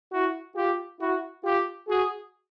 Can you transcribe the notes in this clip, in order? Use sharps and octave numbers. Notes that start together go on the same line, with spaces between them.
E4 F#4
F4 G4
E4 F#4
F4 G4
F#4 G#4